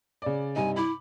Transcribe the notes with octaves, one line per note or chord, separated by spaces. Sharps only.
C#3 D5
G2 C3 D#4 G#5
E4 B5 D6